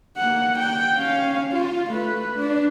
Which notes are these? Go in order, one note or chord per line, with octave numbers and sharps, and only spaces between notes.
A#3 F#5
G5
C#4 F5
F4
A3 B4
D4